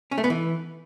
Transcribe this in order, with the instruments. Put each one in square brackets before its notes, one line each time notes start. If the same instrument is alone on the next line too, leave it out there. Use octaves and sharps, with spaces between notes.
[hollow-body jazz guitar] C#4
A3
B3
E3